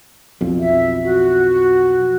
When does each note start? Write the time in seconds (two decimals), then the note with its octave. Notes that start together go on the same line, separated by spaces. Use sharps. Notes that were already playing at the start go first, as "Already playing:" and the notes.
0.41 B1 F2
0.59 E5
1.02 F#4